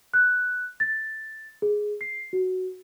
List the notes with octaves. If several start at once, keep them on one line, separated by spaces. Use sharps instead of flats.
F#6
A6
G#4
C7
F#4